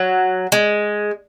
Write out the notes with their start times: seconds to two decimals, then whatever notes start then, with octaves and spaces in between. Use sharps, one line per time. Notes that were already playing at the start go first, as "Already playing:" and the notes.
Already playing: F#3
0.52 G#3